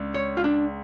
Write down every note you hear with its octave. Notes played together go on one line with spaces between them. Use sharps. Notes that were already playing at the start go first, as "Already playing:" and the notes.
Already playing: C#2 D4
C#5
F4
D4